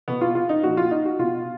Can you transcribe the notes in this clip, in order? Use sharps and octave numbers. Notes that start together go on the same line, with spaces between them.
B2 B3
F4
F4
D#4
A#2 F3 F#4
F4
D#4
F#4
B2 F4